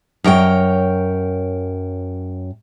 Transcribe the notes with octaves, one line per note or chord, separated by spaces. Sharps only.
F#2 A#4 C#5 G5